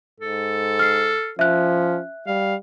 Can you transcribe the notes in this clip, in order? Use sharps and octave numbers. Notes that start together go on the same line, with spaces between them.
G#2 A4
F6 C7
F3 C#4 E5 F#6
G3 F5